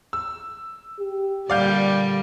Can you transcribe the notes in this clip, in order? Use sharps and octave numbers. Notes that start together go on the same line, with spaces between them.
E6
G4
A#2 D3 G3 D5 F5 G6